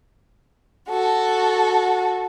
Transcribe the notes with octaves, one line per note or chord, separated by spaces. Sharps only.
F#4 A4